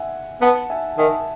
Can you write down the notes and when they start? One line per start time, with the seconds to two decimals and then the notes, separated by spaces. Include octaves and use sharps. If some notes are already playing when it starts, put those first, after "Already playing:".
Already playing: E5 F#5 G#5
0.41 B3 F#5 A5
0.70 E5 G#5
0.98 D#3 E5 G#5